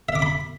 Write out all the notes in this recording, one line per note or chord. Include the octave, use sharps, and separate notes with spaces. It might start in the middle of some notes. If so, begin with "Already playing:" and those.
E5
D6
B5